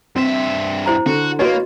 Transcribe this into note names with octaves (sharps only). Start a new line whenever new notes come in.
G2 C4 E5
E4 C5 A#5
D3 F#4
A#3 F#4 B4 C#5 D#5